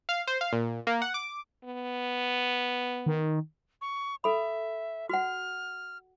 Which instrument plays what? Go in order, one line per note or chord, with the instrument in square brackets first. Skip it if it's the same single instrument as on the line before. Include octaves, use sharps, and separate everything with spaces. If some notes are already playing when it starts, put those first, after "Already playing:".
[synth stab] F5
C5
F5
A#2
A#3
F#5
D6
[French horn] B3
[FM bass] D#3
[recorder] C#6
[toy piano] A4 B5 [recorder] E5
[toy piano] F#4 F#5 [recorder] F6